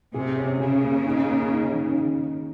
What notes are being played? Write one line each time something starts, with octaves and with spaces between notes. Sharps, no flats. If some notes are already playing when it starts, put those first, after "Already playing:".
C3 G#4
C#4
C#3 G#4
A#3
D#4
A#3
D#4
D#3